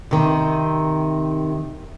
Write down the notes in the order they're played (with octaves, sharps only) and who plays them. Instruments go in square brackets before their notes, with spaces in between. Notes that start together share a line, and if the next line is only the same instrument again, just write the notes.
[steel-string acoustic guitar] C3 D#3